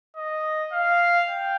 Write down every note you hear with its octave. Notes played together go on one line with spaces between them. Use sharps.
D#5
F5
G5